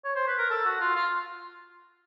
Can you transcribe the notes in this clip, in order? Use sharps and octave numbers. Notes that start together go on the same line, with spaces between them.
C#5
C5
B4
A#4
A4
F#4
F4
F4